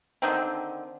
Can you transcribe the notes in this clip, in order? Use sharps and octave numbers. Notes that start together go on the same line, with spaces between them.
D3 D#3 C4